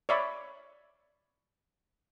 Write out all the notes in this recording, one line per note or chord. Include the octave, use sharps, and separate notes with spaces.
C#5 D5 E5 B5